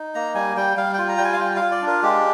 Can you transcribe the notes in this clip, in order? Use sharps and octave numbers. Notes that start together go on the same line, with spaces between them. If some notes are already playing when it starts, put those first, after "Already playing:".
Already playing: D#4
A#3 A#5
G3 G#5
G3 G5
G3 F5
F4 G5
A#5
G3 G5
G#5
F5
F4 G5
F4 F5
D5
D4
A#4
G#3 G4